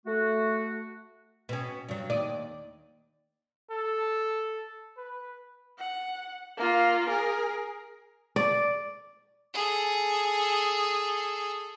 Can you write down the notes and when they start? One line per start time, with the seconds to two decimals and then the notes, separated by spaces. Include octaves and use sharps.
0.06 A3 F#4
1.49 B2 C#4
1.88 G2 F#3
2.10 D#2 D5 D#5
3.71 A4
4.97 B4
5.79 F#5
6.57 A#3 F4
7.09 G#4 A#4
8.36 D5
9.54 G#4 A4